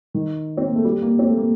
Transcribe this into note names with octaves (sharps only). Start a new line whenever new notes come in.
D#3
C4
A#3
A3
G3
A#3
C4
A3
A#3